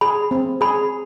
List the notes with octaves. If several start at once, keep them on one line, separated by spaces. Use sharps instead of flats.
G#4 B5
C4
G#4 B5